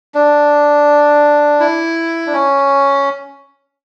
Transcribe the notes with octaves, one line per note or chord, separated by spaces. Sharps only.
D4
E4
D4
C#4